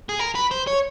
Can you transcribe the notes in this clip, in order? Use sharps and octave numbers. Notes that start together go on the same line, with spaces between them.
G#4
A#4
B4
C5
C#5